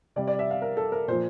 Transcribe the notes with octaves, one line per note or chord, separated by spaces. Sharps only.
C3 G3 D5
D5
E5
F5
A#4
A4
A#4
A#2 F3 C5